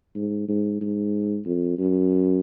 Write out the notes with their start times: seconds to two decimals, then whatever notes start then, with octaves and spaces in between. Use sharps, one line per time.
0.15 G#2
0.48 G#2
0.81 G#2
1.45 F2
1.78 F#2